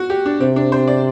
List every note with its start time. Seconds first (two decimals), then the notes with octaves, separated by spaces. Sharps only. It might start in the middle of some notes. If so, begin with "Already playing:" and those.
Already playing: F#4
0.10 G4
0.26 D4
0.40 C3 C4
0.56 D4
0.72 C5
0.88 D5